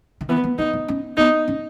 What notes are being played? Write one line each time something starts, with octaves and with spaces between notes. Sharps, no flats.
D#3
E3 B3
B3
C#4 D#4
D#4
C#4
B3 D#4
C#4